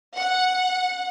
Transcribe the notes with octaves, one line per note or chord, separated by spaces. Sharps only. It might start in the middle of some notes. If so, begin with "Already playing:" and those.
F#5